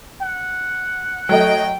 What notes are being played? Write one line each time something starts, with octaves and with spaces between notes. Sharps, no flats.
F#5
F#3 A3 D#5 G5